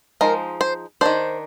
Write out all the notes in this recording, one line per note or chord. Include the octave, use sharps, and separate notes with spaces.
F3 G#3 D#4 A#4
C5
D#3 A#3 D4 C5